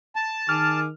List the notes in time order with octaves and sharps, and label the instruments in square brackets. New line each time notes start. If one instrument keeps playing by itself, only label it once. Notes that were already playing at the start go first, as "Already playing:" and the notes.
[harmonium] A5
[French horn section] D#3 [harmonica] G#4 D6 [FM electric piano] F6